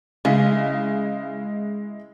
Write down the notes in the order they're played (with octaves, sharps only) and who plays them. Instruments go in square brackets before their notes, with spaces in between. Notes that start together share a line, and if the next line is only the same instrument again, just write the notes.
[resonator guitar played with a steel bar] C#3 [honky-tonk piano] G#3 E4 [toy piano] F5 G#5